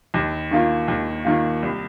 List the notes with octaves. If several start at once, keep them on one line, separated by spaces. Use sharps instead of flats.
D#2
D#3 A#3 F4
D#2
D#3 A#3 F4
C2